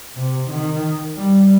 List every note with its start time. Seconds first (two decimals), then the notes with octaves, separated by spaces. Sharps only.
0.17 C3
0.50 D#3
1.17 G3